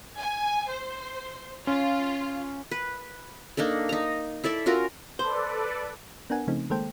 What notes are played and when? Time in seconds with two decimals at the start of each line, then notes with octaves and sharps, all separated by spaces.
0.17 G#5
0.68 C5
1.67 C#4 F4
2.71 B4
3.57 A#3 D4 D#4 A4
3.89 D#4 A#5
4.44 E4 A4 D5 E5
4.66 C#4 F4 F#4 A#4
5.19 A4 B4 C5 D5
6.30 B3 D4 A#4 F#5 G#5
6.48 C#3 F3 A3 C4 D#4
6.70 D#3 G#3 A#3 A4 C5 G5